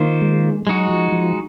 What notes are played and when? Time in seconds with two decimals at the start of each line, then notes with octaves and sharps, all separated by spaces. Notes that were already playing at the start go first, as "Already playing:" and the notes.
Already playing: D#3 A#3 F4 C5
0.22 G#3
0.67 F#3 G#3 D#4 F#4
0.89 F3
1.12 F3